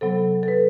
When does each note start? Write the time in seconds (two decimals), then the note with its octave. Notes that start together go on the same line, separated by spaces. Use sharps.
0.01 C3 F#3 B3 A4
0.43 A4
0.48 B4